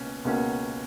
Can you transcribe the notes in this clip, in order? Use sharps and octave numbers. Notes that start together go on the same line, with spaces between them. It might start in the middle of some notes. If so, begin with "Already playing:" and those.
Already playing: C#2 B2 A#3 C#4
C#2 B2 A#3 C#4 F#4